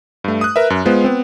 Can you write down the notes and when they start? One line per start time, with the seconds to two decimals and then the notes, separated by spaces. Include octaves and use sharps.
0.24 G2 A3
0.41 D#6 F#6
0.56 A#4 B4 E5
0.70 F#2
0.85 G#3 B3 F4 C5
1.04 B3 C4